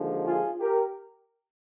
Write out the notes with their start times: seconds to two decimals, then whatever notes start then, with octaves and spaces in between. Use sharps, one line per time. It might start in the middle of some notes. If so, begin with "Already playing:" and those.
Already playing: D#2 D3 F3 G#3
0.25 F4 G#4
0.60 G4 A#4